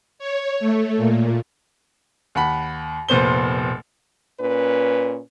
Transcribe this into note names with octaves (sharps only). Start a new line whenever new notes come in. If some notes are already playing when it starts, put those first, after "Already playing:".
C#5
A3
A#2
D#2 F#5 B5
F1 A#2 B3 C5 G7
A#2 C#4 B4